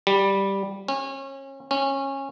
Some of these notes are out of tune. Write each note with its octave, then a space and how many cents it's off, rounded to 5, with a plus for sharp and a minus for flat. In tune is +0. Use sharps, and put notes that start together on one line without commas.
G3 +0
C#4 -30
C#4 -20